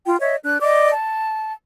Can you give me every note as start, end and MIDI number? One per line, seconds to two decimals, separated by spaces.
0.06 0.16 65
0.06 0.16 79
0.20 0.36 73
0.20 0.36 75
0.20 0.36 76
0.44 0.58 62
0.44 0.58 90
0.62 0.91 74
0.62 0.91 75
0.62 0.91 86
0.92 1.52 81